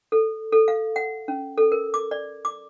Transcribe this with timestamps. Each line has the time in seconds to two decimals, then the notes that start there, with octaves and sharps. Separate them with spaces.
0.12 A4
0.53 A4
0.68 F5
0.96 F#5
1.28 C#4
1.58 A4
1.72 A#4
1.94 D6
2.11 D5
2.45 D6